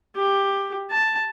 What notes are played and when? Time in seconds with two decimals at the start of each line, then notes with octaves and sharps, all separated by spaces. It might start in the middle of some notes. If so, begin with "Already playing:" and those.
0.16 G4
0.90 A5